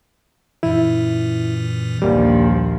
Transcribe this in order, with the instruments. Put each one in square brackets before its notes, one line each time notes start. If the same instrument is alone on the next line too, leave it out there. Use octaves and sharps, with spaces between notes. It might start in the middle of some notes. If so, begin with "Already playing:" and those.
[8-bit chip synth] F#2 A#2 E3 [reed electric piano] E4
[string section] A#1 D#2 F3 [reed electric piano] G3 A#3